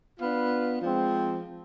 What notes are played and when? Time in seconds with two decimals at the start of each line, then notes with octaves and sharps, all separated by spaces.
0.20 B3 D4 F4 B4
0.81 F3 G#3 C4